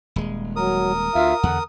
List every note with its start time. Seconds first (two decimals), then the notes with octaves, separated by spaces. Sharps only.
0.16 D#1 G#3
0.56 F#3 A#4 D#6
1.15 D2 F4 E5 F5
1.43 E2 D3 F#5